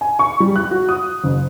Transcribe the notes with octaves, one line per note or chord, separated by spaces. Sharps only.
G#5
C#6
G3
F#6
F#4
D#6
F#1